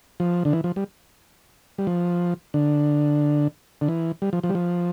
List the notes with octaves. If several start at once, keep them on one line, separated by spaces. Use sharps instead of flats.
F3
D3
E3
F3
G3
G3
F3
D3
D3
E3
G3
F3
F3
G3
F3